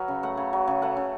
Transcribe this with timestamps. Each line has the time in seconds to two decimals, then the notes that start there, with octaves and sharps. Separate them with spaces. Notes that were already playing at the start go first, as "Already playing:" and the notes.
Already playing: F#3 B4 F5
0.08 C#3
0.23 A3 F#5
0.37 C#3
0.53 F#3
0.67 C#3
0.82 A3 F#5
0.97 C#3